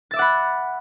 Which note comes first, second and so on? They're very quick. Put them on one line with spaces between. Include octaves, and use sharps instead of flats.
A6 E5 D6 F#5 B5